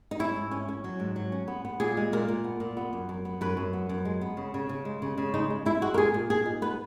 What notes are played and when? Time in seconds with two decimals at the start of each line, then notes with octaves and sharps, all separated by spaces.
0.11 D#4
0.19 C#4 E4
0.36 G#2
0.51 C#4
0.68 C#4
0.84 F#3
1.00 G#2
1.16 F#3
1.32 C#4
1.48 B3
1.65 B3
1.80 A#2 G#4
1.97 G#3
2.13 A#2 A#4
2.28 A#2
2.44 B3
2.60 A#2
2.77 B3
2.93 F#2
3.09 F#2
3.25 B3
3.41 F#2 B4
3.57 F#2
3.73 B3
3.89 F#2
4.05 G#3
4.21 B3
4.37 C#3
4.54 C#3
4.69 C#3
4.85 G#3
5.02 C#3
5.18 C#3
5.34 G#3 D#4
5.50 G#3
5.65 G#3 E4
5.82 G#3 F#4
5.94 A#4
5.98 A#2 G#4
6.14 A#2
6.30 A#2 G#4
6.46 D#4
6.62 B3 B4